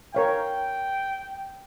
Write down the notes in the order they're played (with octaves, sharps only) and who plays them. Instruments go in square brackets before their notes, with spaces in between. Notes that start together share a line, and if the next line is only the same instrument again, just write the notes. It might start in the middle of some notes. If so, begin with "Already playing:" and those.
[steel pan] A#4 C#5 F5 [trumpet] G5